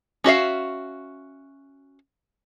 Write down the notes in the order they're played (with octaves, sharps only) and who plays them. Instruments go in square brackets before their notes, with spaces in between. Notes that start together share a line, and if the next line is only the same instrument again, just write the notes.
[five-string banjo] C#4 F#4 E5 F5